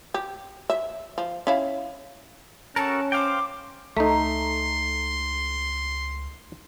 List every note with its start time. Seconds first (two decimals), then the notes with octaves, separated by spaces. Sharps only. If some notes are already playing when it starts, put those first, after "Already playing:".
0.14 G4
0.70 E5
1.18 F3
1.47 C#4 E4 F5
2.76 C#4 F#4 A4 A#4 A5
3.12 C5 F5 G5 D6
3.97 C#2 A3 D#4 A4 A#5 C6 B6